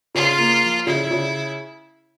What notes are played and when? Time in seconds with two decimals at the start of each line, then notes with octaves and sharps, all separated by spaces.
0.15 C#3 F4
0.39 A#3
0.63 F3
0.87 C#3 E4
1.11 C#3